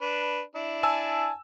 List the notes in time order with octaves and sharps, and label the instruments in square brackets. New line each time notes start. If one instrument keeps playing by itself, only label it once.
[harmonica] D4 B4
D4 E4
[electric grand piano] G#5 A5 E6